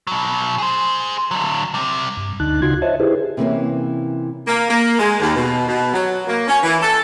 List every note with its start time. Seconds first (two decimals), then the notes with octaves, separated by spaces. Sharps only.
0.07 B2 F#3
0.58 G#4 C5
1.31 D3 F#3
1.74 C3 G3
2.17 G2
2.40 D2 D3 D#4 A5 F#6
2.62 C#3 D#4 F4 F#4 C6 G#6
2.82 C5 C#5 D#5 E5 A5
3.00 E4 G4 G#4 B4 C5
3.37 C3 E3 A#3 C#4
4.47 A#3
4.70 A#3
4.99 G#3
5.21 D#2
5.36 B2
5.68 B2
5.93 F#3
6.27 A#3
6.48 C#4
6.63 E3
6.81 A4